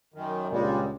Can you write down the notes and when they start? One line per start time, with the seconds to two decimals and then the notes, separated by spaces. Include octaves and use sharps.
0.14 F#2 D#3
0.51 C#2 G2 A#2 G3 G#3